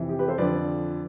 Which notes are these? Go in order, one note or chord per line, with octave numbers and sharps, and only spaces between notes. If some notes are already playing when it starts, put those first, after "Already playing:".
Already playing: F2 C3 E3
G4
G4 B4
A4 C5
F2 D3 F3 B4 D5